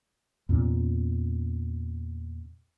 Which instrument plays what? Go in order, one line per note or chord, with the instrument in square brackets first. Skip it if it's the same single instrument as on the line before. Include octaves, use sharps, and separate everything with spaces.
[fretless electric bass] E2 A#2 C#4